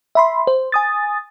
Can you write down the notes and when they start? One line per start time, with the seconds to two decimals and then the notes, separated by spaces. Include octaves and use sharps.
0.15 E5 B5 C6
0.47 C5
0.72 G#5 D#6 A6